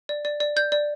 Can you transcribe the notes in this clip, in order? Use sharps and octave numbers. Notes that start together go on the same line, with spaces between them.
D5
D5
D5
D5 G6
D5